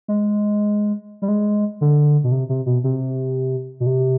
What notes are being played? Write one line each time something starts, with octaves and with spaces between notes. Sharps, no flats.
G#3
G3
G#3
D3
B2
C3
C3
B2
C3
B2
C3